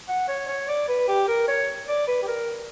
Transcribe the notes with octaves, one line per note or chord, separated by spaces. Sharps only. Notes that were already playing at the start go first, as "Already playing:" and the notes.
F#5
C#5
C#5
D5
B4
G4
A#4
C#5
D5
B4
G4
A#4